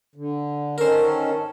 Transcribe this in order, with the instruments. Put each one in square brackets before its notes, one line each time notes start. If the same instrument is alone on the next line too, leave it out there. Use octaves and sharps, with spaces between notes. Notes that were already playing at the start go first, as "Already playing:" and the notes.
[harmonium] D3
[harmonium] D#3 C#4 A4 [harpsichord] A#4 C5